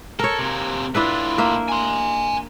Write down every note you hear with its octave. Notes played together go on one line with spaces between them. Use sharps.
A4 A#4 C#5
C3 A#3
A2 D4 E4 F4 B4
A#3 E5
G#5 C6